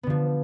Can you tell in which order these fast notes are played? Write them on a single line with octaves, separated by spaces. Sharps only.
B3 D3 F3